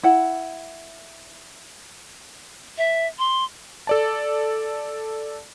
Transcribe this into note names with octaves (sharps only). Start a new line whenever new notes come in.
E4 F#5
E5
C6
A4 D5 A5